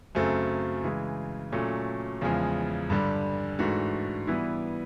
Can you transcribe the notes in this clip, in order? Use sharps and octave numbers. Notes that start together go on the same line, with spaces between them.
F#2 C#3 F#3 A3 C4
C#3 E3 G#3
A#2 F#3 A3 C#4
E2 C#3 F3 G#3
G2 D3 G3
G#2 E3 A3 D4 F#4
E3 G3 B3 E4